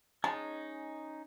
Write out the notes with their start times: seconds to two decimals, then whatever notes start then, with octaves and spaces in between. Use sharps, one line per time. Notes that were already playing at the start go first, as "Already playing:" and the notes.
0.24 G#3 C#4 D#4 A5